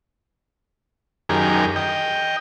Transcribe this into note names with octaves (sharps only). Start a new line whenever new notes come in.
F#2 D#3 G4 G#4 A#4
D#5 G5